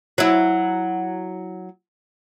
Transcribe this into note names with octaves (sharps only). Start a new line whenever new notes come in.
F#3 E4